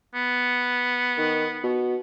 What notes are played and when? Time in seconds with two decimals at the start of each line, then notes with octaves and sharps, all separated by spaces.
0.15 B3
1.18 D#3
1.64 B2